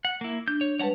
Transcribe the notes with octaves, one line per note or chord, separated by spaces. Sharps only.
F#5
A#3 E4
D4 G6
C#5
G3 G#3 B4 C#5 F#5 A5